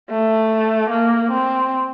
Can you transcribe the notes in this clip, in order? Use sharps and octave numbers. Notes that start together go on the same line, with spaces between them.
A3
A#3
C4